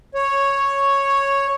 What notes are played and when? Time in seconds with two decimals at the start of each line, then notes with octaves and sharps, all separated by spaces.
0.14 C#5